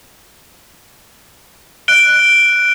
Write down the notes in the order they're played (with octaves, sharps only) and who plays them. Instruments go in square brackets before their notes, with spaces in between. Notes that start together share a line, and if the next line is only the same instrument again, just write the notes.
[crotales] F#6 D7 G7